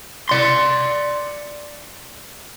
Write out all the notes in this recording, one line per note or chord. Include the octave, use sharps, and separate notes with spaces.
D5 C6